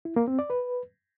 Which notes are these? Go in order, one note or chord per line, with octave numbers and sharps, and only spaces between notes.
E4
A#3
C4
D5
B4